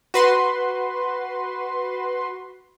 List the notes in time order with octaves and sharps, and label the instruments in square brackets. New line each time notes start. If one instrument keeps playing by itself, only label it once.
[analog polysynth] F#4 B4 C6